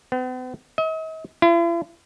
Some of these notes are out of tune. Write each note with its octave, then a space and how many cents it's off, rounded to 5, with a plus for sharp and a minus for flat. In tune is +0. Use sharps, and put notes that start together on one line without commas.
B3 +45
D#5 +45
E4 +45